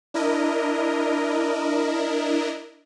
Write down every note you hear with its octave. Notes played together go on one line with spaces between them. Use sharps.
D4 E4 A#4 D#5